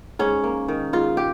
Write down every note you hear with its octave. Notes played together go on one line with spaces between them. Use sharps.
G#2 C#4
A#3
D#3
G#2 F4
G4